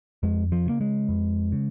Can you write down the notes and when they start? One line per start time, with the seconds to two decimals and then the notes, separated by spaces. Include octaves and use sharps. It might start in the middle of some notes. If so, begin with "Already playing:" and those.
0.23 F2 G#3
0.52 F3
0.66 C#3 A#3
0.81 G#3
1.08 F2
1.52 C#3